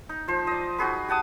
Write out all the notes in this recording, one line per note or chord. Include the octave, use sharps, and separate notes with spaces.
D#4
F3 C5
D5 D#5
D#4 F#4 G#4 B4
G4 F#5 A5 D#6